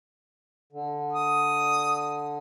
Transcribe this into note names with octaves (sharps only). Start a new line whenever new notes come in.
D3
D#6